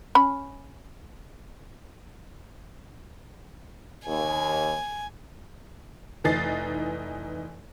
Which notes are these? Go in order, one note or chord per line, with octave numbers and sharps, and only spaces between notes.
C#4 B5
D#2 G#5
F1 E3 D#4 A6 C7